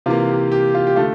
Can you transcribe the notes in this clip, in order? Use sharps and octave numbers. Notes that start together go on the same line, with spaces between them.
C3 E3 A#3 F4
G4
G4
F4
G4
D3 A3 F4